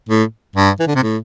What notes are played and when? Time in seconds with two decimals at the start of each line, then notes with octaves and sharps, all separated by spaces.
0.09 A2
0.56 G2
0.80 E3
0.87 D3
0.95 C3
1.03 A2